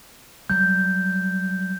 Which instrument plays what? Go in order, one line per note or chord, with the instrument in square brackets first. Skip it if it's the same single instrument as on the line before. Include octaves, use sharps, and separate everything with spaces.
[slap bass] F#3 G3 [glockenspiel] G6